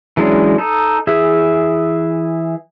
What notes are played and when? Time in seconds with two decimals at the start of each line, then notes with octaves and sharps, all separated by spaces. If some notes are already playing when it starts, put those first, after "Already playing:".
0.17 E3 F#3 G#3 C#4 D4
0.58 D#4 A4
1.07 E3 G#4 E5